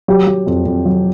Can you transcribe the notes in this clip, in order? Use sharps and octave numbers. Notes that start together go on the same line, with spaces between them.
F#3 G4
F#3
F2
F2
F#3